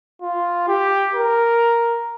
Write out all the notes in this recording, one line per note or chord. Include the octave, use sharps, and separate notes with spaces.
F4
G4
A#4